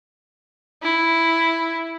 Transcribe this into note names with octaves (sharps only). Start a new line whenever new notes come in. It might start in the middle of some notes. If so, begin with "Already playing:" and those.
E4